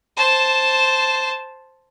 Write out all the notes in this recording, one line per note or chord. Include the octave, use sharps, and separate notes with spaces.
C5 A5